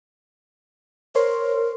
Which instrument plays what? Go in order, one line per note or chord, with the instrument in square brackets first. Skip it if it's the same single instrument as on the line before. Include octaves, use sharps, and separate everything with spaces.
[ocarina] A#4 [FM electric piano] C5 C#5 C6